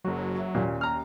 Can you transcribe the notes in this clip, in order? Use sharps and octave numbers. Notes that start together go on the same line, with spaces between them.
F#1 F#3 F#4
F#4 E5
D#2 A#2 C#4
A#5 F6